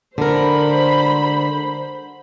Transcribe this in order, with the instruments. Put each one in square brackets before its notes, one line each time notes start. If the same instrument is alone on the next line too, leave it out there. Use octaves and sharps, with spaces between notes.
[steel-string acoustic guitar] D3 A#4 [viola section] C5 B5